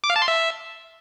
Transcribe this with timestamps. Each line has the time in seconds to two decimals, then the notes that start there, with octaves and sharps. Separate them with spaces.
0.04 D6
0.10 F5
0.16 A5
0.22 C6
0.28 E5